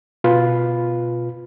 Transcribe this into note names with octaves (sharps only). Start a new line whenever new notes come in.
B2 F4 B4